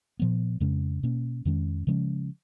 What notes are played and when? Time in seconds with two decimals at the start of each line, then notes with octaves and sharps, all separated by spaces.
0.19 A#2 F3 B3
0.60 F2 C#3 G#3 C#4
1.03 B2 A#3 C#4
1.45 F2 D#3 G#3 C#4
1.87 C#3 F3 G#3 C#4